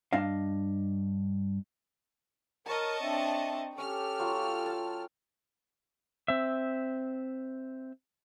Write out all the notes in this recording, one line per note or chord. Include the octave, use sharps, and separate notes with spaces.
G2 D4 D#5 F5
A#4 C#5 D#5 A5 A#5 C#6
C4 D4 E5
C#4 G4 A4 G5 F6
F#3 F4
A5
C4 E5